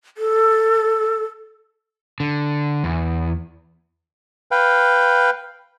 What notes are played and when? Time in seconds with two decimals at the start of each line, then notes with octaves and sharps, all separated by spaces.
0.18 A4
2.20 D3
2.84 E2
4.51 B4 F5 G5